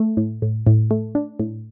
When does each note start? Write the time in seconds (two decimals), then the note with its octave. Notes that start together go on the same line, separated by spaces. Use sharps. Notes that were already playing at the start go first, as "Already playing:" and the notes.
Already playing: A3
0.17 A2
0.42 A2
0.67 A2
0.91 A3
1.15 D4
1.40 A2